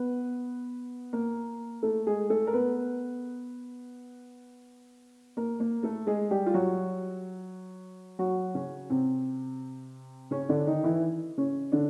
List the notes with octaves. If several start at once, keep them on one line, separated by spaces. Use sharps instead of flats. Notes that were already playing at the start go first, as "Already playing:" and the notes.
Already playing: B3 B4
A#3 A#4
A3 A4
G#3 G#4
A3 A4
A#4
B3 B4
A#3 A#4
A#3 A#4
A3 A4
G#3 G#4
G3 G4
F4
F#3 F#4
F#3 F#4
C#3 C#4
C3 C4
C#3 C#4
D3 D4
D#3 D#4
E3 E4
C#3 C#4
D3 D4